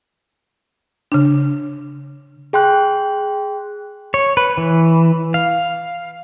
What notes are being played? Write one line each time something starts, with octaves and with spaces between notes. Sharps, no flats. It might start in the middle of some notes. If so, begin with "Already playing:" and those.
C#3 D4
G#4 G5 C6 F#6
C#5
B4
E3
F5